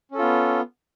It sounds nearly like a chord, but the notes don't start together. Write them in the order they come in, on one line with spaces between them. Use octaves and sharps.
C#4 A4 F4 B3